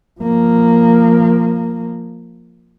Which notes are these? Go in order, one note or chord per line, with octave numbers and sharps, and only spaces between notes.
F3 A#3